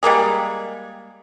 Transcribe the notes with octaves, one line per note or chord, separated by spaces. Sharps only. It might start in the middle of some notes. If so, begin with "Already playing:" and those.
G3 G#3 A#3 G#4